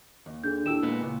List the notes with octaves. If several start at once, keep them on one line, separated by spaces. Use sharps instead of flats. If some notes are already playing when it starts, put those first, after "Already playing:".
D#2
D3 D4 G#4 G6
D#2 E4 G4 E6 E7
A#2 G#3 B3
C#2 A#2